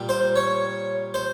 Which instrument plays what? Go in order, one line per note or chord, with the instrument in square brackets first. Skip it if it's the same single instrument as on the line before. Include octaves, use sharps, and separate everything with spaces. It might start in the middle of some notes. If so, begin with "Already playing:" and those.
Already playing: [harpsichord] A#2 G3
C5
C#5
C5